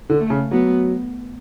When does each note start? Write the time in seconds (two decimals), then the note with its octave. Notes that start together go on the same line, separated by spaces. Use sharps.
0.10 D3
0.20 A3
0.30 C#3
0.51 F#3 B3